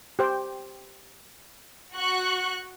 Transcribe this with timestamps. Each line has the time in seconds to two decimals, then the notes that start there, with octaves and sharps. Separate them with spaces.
0.19 G4 C5 G5
1.95 F#4 C#6 F#6